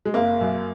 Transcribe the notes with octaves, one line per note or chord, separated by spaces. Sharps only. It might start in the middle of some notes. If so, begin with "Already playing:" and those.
G#3
F#1 A#3
F#2